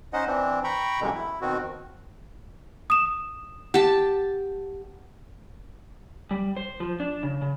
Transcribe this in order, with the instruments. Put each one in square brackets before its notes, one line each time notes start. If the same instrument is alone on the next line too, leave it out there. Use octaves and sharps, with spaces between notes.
[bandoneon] C#4 D#4 C5 D#5 F#5
E3 C4 D4
G5 A#5 B5 C#6
F#2 B2 D3 E3 G3 G#3
E4
B2 D#3 C4 F#4
[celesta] D#6 E7
[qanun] G4 A5 [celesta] F#5
[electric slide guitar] G3
C5
F3
D4
C#3
C#3